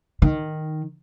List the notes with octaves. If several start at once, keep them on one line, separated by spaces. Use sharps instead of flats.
D#3